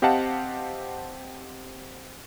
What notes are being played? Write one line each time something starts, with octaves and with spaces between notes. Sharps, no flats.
C4 G4 D#5 F5 F#5 A5